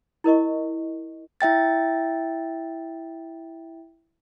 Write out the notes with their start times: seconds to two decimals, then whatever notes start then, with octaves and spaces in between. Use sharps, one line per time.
0.24 E4 A#4 D#5 C#6
1.41 E4 E5 G5 A6